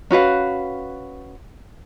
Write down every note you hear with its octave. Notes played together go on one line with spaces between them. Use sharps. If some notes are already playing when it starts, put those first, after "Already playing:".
C#4 F#4 B4 F5